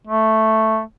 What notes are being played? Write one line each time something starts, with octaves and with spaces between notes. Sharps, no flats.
A3